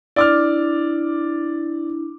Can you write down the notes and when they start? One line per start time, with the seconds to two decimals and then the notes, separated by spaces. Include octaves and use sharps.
0.16 D4 E4 D5 D6 F6